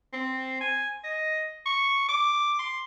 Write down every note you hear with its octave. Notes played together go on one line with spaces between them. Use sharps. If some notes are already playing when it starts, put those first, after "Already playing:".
C4
G#5
D#5
C#6
D6
C6